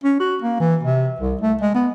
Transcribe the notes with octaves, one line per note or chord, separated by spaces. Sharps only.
C#4
F#4
A#3
E3
C3
C2
A3
G#3
B3